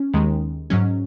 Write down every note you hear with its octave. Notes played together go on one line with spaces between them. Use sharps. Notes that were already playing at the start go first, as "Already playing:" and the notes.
Already playing: C#4
D#2 D#3 G#3
G#2 F#3 C#4